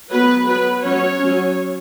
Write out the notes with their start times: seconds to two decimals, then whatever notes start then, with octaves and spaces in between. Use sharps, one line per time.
0.11 F#3 B3 B4
0.47 F#3 B3 B4
0.83 F#3 C#4 C#5
1.20 F#3 C#4